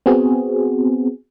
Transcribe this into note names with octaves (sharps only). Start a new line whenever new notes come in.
B3 C4 F#4 G#4